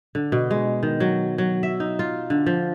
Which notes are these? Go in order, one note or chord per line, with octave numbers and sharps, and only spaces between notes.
D3
B2
G#3
D#3
F#3
F#3
E5
D#4
F4
D3
F3